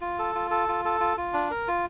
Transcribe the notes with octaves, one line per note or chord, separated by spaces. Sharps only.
F4
A4
F4
A4
F4
A4
F4
F4
D4
A#4
F4